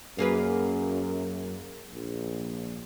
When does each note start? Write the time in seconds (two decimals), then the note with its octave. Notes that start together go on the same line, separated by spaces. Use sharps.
0.18 F#2 A#3 G#4 B4
1.94 A#1